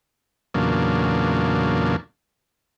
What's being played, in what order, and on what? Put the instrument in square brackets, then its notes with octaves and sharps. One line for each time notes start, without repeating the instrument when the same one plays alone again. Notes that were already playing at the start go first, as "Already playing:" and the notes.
[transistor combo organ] E2 A#2 C#3 F#3 A#3 D4